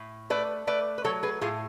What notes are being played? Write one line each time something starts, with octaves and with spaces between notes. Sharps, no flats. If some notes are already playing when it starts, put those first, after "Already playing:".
Already playing: A2
A3 B4 D5
A3 B4 D5
B4
F#3 A4 C#5
G#4 B4
A2 F4 G#4